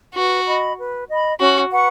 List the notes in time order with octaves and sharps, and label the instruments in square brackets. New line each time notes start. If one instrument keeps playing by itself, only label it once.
[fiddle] F#4 [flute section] B4
[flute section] D#5 B5
B4
D#5 B5
[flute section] C#4 [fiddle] F#4
[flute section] B4 F#5 C#6